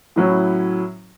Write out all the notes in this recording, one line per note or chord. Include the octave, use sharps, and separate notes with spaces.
A2 F#3 C#4 E4